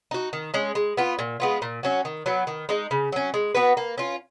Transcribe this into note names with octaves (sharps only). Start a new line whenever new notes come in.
D#4 F#4
D#3
G#3 C#4
G#3
B3 F4
A#2
G#3 B3 F4
A#2
F#3 C#4 F#4
D#3
F#3 B3
D#3
G#3 D#4
C#3
F#3 C#4
G#3
B3 F#4 B4
A#3
C#4 F4